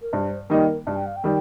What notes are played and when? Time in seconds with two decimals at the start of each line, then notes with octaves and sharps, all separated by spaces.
0.01 A#4
0.13 G2 C5
0.50 D#3 G3 A#3 D#4 A#4
0.87 G2 A5
0.96 G5
1.06 F5
1.16 G5
1.24 D#3 G3